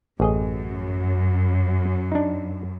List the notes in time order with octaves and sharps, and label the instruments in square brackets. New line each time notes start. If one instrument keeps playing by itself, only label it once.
[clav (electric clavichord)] A1 G#4 D#5 [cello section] F#2
[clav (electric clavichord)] D4 D#4